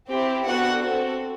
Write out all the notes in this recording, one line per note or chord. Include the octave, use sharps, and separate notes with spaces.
C4 E4 G4
B3 D4 F#4 A4 F#5
C4 F#4 A4